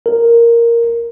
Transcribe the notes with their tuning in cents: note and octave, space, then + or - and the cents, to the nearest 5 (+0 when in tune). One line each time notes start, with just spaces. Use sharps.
A#4 +0